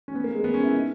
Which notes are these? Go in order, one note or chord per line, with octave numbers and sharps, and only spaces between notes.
C#4
B3
A#3
G#3
B3
C#4
E4
D#4